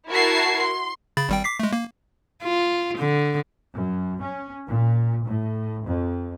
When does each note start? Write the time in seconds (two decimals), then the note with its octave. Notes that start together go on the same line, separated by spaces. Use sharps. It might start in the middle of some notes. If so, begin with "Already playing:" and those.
0.10 E4 F#4 A#4 A5 G#6 C7
0.62 C6
1.17 C#3 B5 A6
1.29 G#1 G3 G5
1.44 D6 B6 C7
1.60 G#3 A3
1.73 A#3
2.43 F4
2.98 D3
3.72 F#2
4.20 C#4
4.67 A#2
5.24 A2
5.85 F2